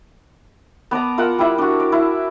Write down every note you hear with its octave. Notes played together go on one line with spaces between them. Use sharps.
B3 D5 A5 A#5
F4 A#4 F#5 E6
G3 E4 E5
D4 F#4
D5
E4